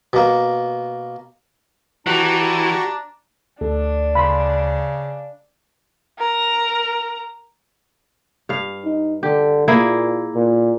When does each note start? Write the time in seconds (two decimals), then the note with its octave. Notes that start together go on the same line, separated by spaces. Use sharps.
0.13 B2 A#3
2.07 E3 D4 F#4 G4 A#5 C#6
3.61 D2 D4 A4
4.15 C#3 B5 C6
6.19 A#4 A#5
8.49 G2 F5
8.85 D#4
9.23 D3 G4
9.68 A#2 A#3 E4 G#4
10.35 A#2